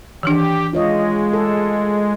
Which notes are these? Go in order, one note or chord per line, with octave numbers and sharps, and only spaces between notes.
D#3 E3 D4 G4
G#3 F4 C#5 D#5
A4